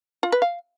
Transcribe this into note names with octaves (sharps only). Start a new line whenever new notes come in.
F4
B4
F5